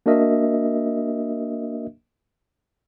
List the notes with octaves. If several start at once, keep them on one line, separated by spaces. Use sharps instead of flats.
A#3 D4 F#4 A#4 D#5 E5